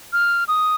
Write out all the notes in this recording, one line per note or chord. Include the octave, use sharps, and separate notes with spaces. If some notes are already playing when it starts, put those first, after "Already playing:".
F6
D#6